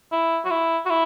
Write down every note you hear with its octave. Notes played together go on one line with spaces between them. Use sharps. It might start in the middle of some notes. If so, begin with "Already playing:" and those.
E4
F#4
E4
F#4
E4